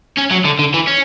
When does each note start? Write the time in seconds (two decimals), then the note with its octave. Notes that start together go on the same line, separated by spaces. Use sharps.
0.17 C#4
0.31 F#3
0.45 D3
0.59 D3
0.74 E3
0.87 C#4